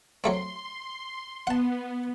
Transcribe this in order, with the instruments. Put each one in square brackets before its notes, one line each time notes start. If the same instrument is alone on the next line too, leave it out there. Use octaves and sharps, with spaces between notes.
[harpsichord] F#3 A3 C4 [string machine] C6
[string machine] B3 [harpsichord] F#5 A5